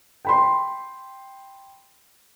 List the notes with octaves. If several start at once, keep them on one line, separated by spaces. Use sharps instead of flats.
G5 B5 C6